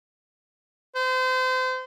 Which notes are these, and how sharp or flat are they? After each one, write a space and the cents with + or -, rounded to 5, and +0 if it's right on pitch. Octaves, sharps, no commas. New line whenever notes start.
C5 -30